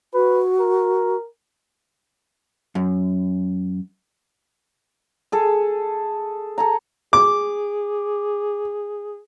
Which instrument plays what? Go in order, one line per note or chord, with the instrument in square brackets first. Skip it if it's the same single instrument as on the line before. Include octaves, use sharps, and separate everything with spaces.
[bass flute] F#4 [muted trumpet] B4
[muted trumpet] A#4
[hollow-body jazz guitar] F#2
[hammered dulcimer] G#4 A4
A4 G#5 A#5
[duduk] G#4 [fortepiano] D6